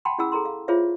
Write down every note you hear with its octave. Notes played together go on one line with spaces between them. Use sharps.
F#5 G5 A5 B5 C6
C#4 E4 G#4 F#5 B5 E6
G#4 A4 A#5 C6
F5
F4 G#4 C5 C#5 E5 F5